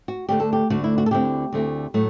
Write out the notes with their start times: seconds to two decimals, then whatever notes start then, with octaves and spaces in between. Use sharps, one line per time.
0.08 F#4
0.29 D2 D3 A3 G4
0.40 A4
0.53 G4
0.70 D2 D3 A3 F#4
0.84 E4
0.98 F#4
1.06 A4
1.11 D2 D3 A3 C4 E4 G4
1.53 D2 D3 A3 C4 E4
1.94 A2 F#3 A3